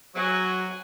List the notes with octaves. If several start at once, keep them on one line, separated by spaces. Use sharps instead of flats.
F#3 F#5 G#5